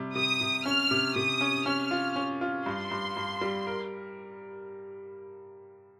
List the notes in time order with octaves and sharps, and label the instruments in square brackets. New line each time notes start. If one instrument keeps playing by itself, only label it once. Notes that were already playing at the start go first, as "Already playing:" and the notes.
Already playing: [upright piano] C3 G3
[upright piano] C3 [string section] D#6
[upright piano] C3
[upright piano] C#4 [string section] F6
[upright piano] C3
[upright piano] C3 [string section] D#6
[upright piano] C#4
[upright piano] C#4 [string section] F6
[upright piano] F4
C#4
F4
[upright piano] G2 [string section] C6
[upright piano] G2
G2
G3
A#4